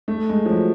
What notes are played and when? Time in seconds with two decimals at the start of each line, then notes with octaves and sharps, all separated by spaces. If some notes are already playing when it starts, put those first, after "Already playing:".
0.08 A3
0.29 G#3
0.46 F3
0.50 F#3